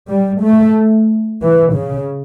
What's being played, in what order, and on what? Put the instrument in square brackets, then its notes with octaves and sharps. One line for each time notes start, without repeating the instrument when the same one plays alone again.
[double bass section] G3
A3
E3
C#3